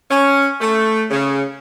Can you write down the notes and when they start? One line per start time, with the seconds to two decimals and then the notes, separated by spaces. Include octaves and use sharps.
0.09 C#4
0.61 A3
1.11 C#3